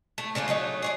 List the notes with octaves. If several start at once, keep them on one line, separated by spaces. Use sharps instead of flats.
A3
C#3 A3 D4 F4
F#3 A3 D#4 C#5
G#4 C#5 D5